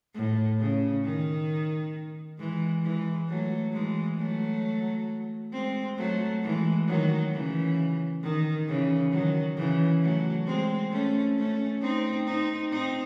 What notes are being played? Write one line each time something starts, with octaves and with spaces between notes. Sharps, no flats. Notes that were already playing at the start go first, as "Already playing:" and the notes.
A2
C#3
D#3
E3 G#3
E3 G#3
F#3 A3
E3 G#3
F#3 A3
G#3 C4
F#3 A3
E3 G#3
D#3 F#3
C#3 E3
D#3
C#3 E3
D#3 F#3
C#3 E3
F#3 A3
G#3 C4
A3 C#4
A3 C#4
C4 D#4
C4 D#4
C4 D#4